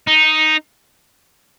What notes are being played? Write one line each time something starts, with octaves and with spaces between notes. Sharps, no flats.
D#4